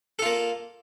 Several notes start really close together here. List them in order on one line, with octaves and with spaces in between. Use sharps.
A4 F4 A#3